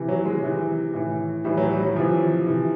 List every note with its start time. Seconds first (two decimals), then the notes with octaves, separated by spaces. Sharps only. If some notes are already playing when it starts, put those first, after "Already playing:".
Already playing: C3 E3
0.08 F#3
0.25 G#3
0.43 C3 E3
0.93 A2 E3
1.44 A2 E3 G3
1.57 F#3
1.71 G3
1.83 F#3
1.96 C3 E3 F3
2.47 C3 E3